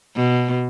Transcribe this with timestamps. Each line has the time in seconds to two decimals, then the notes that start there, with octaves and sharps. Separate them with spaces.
0.16 B2